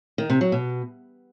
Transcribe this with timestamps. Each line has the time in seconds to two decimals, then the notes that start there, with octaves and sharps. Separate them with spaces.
0.18 D#3
0.30 C3
0.41 F#3
0.52 B2